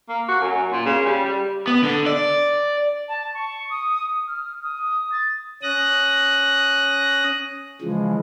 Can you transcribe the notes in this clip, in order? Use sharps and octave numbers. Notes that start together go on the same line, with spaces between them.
A#3
F#4
F#2
A#2
C#3
G3
G3
B3
D3
D5
A5
C#6
D#6
F6
D#6
A6
C#4 D#6 F#6 A#6
C#3 E3 F3 G#3